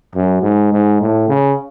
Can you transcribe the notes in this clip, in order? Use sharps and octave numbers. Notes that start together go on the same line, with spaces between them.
F#2
G#2
G#2
A2
C#3